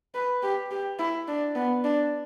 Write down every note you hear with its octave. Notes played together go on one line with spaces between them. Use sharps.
B4
G4
G4
E4
D4
B3
D4